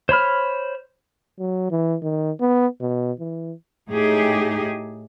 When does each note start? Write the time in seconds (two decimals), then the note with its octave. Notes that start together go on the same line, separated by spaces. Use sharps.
0.09 C5 C#5 B5 F6
1.39 F#3
1.71 E3
2.02 D#3
2.40 B3
2.81 B2
3.20 E3
3.91 A2 D#4 G4 G#4